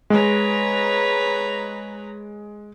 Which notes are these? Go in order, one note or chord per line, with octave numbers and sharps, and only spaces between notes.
G#3 B4 C#5 A#5